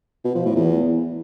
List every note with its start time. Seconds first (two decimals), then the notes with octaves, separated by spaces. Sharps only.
0.25 B2
0.35 F3
0.45 A2
0.55 E2